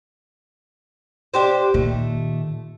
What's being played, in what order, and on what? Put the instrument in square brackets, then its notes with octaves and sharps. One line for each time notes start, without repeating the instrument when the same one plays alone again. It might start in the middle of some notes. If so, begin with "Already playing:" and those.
[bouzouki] D4 G4 C5
[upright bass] A#2 D#3 [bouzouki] A3